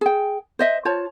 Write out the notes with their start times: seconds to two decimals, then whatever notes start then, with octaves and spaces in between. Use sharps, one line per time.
0.01 G#4 G5
0.59 C5 D#5 E5
0.85 F4 C5 C#5 A5